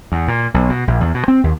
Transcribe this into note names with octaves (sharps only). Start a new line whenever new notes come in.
E2
A#2
B1
B2
A#1
E2
B2
C4
D#2